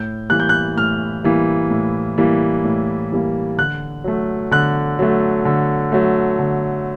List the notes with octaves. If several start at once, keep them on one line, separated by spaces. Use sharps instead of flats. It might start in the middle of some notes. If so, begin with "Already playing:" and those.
Already playing: A2 G6
E3 G3 A#3 F#6
G6
F#6
A2 F6
E3 G3 A#3
A2
E3 G3 A#3
A2
E3 G3 A#3
D3 F#6
F#3 A3
D3 F#6
F#3 A3
D3
F#3 A3
D3